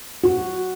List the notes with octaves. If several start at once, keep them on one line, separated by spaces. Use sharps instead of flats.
F#4